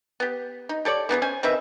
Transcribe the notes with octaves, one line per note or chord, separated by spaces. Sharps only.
B3 G4
D#4
G4 A4 C#5 D5
E3 B3 D#4 G#4
C#4 C5 G#5
D#3 C4 B4 E5